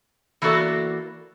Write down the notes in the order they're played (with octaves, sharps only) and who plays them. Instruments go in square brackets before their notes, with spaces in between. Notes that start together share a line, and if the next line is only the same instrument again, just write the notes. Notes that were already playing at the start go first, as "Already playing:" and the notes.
[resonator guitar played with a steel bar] E3 A#3 B3 F#4 A4 D5